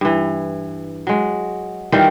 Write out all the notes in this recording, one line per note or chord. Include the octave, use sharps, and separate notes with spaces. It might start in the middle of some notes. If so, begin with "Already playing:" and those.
G2 E3
F#3 G#3
D#3 E3 G3 F4